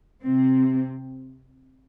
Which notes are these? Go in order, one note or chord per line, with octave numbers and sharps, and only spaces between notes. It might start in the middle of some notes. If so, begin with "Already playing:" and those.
C3 C4